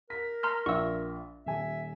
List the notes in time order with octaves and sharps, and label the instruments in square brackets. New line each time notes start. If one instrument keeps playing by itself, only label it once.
[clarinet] A#4 [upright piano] B6
[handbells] A#5 C6 F6
[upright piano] A#1 F4 E5 [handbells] C#6 E6
[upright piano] D#1 G#5 [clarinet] E5